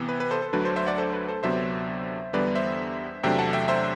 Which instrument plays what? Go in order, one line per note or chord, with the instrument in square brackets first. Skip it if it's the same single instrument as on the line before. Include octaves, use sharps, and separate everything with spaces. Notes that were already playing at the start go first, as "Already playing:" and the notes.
Already playing: [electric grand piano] C3 E3 B3
B4
B4
A4 C5
A4
D2 D3 F#3 A3 D4 B4
A4 C5
C5 E5
D5 F#5
A4 C5
B4
A4 C5
D2 C3 F#3 B3 D4 C5 E5
E2 D3 G3 B3 B4 D5
C5 E5
E2 C3 F#3 A3 D4 E5 G5
F#5 A5
E5 G5
C5 E5